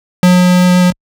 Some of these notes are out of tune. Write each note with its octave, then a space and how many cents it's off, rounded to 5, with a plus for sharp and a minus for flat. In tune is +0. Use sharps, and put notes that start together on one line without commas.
F#3 -45